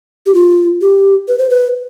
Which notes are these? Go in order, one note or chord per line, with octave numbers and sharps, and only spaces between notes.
G4
F4
G4
B4
C5
B4